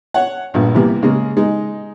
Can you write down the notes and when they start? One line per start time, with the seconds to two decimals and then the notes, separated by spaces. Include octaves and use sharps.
0.14 C#5 F#5
0.54 A#1 G2 A#2
0.74 C3 E3 G3 A#3 B3
1.03 C#3 G#3 A#3
1.37 G#3 D#4